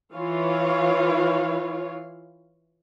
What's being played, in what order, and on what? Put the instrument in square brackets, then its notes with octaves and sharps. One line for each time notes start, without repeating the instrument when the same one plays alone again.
[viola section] E3 F4 C#5 F5